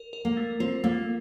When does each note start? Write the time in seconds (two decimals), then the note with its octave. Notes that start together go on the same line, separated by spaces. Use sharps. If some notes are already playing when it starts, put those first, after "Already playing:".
Already playing: A#4
0.13 A#4
0.25 A#3
0.37 A3
0.60 C4 F4
0.84 A3 A#3